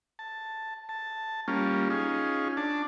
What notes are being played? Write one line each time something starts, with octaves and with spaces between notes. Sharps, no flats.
A5
A5
G3 A#3 C#4 F4
C#4 D#4 F4 G#4
D4 A5